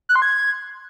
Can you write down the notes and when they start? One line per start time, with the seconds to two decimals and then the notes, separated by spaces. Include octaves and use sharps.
0.09 F#6
0.16 C6
0.22 G#6